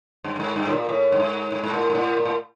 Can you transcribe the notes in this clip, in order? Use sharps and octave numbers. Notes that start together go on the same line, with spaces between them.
G2
G2
G#2
G2
A2
A#2
A2
G2
G#2
G#2
G#2
A2
G#2
A2
A#2
A2